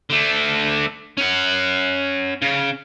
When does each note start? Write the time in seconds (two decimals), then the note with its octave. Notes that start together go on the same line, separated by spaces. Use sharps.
0.10 D3 A3
1.17 C#4 F#5
2.42 C#3